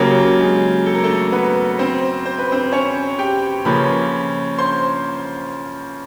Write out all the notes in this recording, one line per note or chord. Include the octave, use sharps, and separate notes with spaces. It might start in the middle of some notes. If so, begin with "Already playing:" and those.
Already playing: C#3 F#3 A#3 G4
G#3 G#4
A4
A#4
A3 A4
B3 B4
C4 C5
C5
B4
C4 C5
C#4 C#5
G4 G5
C#3 F3 A#3 C#4 B4 B5
C5 C6